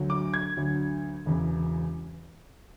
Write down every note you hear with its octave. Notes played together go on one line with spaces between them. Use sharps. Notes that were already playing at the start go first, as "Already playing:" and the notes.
Already playing: D2 D3 F#3
D6
G#6
D2 D3 F#3
E1 E2 C#3 E3